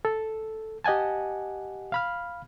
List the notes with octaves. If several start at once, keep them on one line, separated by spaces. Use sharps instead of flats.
A4
G4 D#5 F#5 G#5 A5
F5 B5 F6